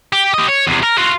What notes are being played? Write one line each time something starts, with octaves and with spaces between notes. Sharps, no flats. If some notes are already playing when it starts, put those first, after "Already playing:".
G4
G4 D#5
C#5
E2 C3
A#4
F4 F#4